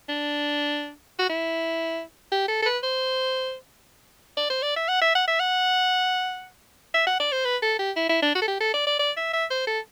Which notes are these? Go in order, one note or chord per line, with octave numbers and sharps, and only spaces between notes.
D4
F#4
E4
G4
A4
A4
B4
C5
D5
C5
D5
E5
F#5
E5
F#5
E5
F#5
E5
F#5
D5
C5
B4
A4
G4
E4
E4
D4
F#4
A4
G4
A4
D5
D5
D5
E5
E5
C5
A4